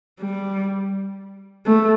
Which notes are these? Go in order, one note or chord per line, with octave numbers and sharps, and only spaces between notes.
G3
A3